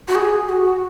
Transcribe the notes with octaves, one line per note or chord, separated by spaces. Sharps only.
F#4
G#4
F#4